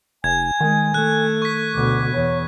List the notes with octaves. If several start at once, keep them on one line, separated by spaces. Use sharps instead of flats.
F1 G#5 G#6
D#3 G#3
A3 F#6
C#6 B6
D2 B2 D6
E2 C#5